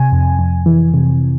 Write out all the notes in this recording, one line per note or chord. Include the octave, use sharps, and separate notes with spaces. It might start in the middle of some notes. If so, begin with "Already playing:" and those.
Already playing: C3 G#5
F2
F2
E3
C3